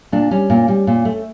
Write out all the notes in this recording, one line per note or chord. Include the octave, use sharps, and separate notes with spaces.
A#2 D4
G3 C#4
A#2
G3
A#2
A3